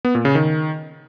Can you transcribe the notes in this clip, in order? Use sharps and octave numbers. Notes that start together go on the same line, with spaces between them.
B3
A#2
C#3
D#3